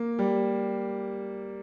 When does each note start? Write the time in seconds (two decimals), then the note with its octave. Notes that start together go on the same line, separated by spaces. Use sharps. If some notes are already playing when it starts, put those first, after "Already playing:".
Already playing: A#3
0.19 G3